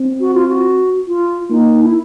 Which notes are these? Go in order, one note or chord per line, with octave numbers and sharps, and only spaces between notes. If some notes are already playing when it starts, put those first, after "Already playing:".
Already playing: C4
F#4
F4
F#4
F4
A#3 D#4
E4